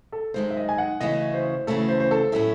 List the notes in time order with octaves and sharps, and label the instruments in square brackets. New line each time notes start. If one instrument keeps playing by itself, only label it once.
[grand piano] A4
[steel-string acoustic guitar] F#2 D#3 G#3 D#4 [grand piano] C5
[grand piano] E5
D#5
G#5
F#5
[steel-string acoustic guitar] C#3 E3 A3 C#4 F#4 [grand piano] D#5
[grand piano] C5
[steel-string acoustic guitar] C#3 E3 A3 C#4 F#4 [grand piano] A4
[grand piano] C5
C5
A4
[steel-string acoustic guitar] A2 F#3 A3 C#4 E4 [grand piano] A4